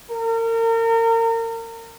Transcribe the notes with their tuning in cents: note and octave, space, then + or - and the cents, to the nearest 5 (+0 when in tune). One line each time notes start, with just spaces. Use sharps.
A#4 -35